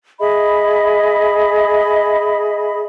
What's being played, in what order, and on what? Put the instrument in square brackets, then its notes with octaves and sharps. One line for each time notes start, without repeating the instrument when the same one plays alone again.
[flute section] G#4 D#5 E5 B5